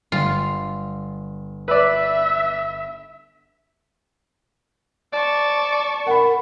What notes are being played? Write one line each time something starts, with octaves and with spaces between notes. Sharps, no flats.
G1 G3 F4
B4 D5 E5 E6 B6
D5 A5 C#6
A#4 F#5 B5